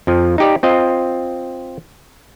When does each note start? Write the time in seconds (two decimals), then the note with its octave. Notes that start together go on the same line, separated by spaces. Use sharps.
0.07 F2 F3
0.38 D#4 G4 D5
0.63 C4 F4 D#5